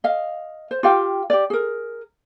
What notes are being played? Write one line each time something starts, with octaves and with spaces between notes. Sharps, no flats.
D#5 F5
C5
F4 G4 F5 G5
G4 D5
G#4 A#4